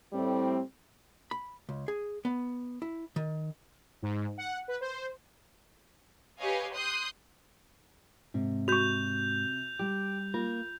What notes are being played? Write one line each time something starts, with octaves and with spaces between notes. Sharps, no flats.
A2 G3 C4
B5
C#2
G#4
B3
E4
D#3
G#2
F#5
B4
C5
G4 B4 C#5 D#5 F5 G#5
C6 D#6 F#6 G6 C7
G#2 C3
F#4 C#6 G6 F7
G3 G4
A#3 F4